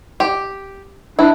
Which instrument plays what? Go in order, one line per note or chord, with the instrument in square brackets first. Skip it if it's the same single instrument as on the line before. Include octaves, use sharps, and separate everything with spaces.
[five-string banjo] G4
[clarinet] D4 [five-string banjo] E4